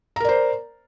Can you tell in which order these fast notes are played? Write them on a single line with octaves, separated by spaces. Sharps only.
A#5 A#4 D5 C5